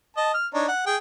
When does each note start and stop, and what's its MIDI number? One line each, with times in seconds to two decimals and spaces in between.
0.17 0.33 75
0.17 0.33 81
0.34 0.48 89
0.54 0.67 62
0.54 0.67 63
0.54 0.67 73
0.68 0.85 78
0.87 0.97 68
0.87 0.97 79